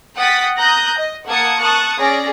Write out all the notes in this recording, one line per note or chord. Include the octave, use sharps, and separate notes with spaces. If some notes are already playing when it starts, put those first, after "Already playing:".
F#5 G5 D#6 A6 B6
A#5 D#6 F#6 G6 A#6
D#5
A#3 F#5 A5 D#6 G#6 C#7
A5 C#6 D#6 F#6
C#4 G#4 D5 A#6